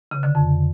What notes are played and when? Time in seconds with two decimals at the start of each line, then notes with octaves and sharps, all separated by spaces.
0.11 C#3
0.23 D3
0.35 F2